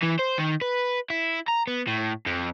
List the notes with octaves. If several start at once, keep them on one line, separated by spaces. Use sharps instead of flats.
E3
C5
D#3
B4
E4
A#5
B3
A2
F2